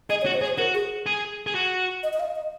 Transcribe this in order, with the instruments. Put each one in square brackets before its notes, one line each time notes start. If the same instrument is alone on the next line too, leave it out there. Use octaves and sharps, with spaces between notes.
[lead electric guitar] G#4 [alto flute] D#5
[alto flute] C#5
[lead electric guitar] F#4
[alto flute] C5
[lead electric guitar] G#4 [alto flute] C#5
[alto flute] C5
[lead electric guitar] F#4 [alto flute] A#4
[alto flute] G#4
[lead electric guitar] G#4
G#4
F#4
[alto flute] D#5
D#5
F5
D#5